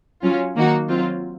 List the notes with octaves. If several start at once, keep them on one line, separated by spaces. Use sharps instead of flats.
F#3 C#4 F4
D#3 A#3 D#4 F#4
F#3 C4 F4